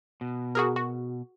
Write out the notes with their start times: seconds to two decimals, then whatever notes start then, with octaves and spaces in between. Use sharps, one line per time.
0.21 B2
0.55 F#4 G#4 A#4
0.76 F#4